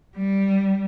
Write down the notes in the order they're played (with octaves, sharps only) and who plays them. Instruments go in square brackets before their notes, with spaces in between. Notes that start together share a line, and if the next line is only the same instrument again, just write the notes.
[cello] G3